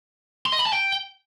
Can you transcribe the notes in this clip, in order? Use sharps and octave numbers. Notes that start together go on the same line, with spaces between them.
C6
D#5
B5
A5
G5